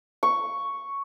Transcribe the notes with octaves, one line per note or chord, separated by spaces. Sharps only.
C#6